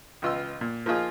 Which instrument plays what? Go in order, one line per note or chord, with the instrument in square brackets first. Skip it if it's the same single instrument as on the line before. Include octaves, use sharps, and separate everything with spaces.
[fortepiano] C#2 E3 F4 D#5 C6 E6
A#2
F3 A#3 D#4 F4 G#4